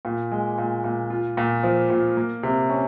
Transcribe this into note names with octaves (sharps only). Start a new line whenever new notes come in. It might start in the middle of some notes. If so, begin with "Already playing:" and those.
A#2
G#3
A#2
A#2
F4
A#2
F3
A#2
A#3
C3
C#4